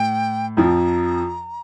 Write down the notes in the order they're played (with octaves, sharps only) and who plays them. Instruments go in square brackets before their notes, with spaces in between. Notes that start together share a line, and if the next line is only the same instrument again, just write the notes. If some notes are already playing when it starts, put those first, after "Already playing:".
Already playing: [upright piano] A2 [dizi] G5
[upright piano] F2 F3 [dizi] A#5